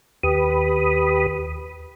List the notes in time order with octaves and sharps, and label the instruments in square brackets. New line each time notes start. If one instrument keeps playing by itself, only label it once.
[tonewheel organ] D#2 G4 B4 B5 D#6